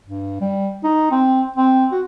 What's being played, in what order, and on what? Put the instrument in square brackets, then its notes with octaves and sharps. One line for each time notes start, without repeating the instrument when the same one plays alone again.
[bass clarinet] G2
G3
D#4
C4
C4
F#4